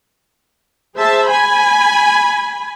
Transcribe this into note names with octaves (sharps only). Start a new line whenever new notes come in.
G#4 C5 E5 A5
G#5 B5